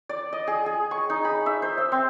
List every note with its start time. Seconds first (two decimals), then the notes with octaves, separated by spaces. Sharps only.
0.09 D5
0.33 D#5
0.47 G#4
0.66 G#4
0.91 C#6
1.10 D#4
1.25 B5
1.46 E5
1.62 C5
1.78 E5
1.92 C4